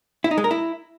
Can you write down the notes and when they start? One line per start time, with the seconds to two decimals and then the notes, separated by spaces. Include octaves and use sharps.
0.24 E4
0.31 D#4
0.38 G#3
0.44 A#4
0.51 E4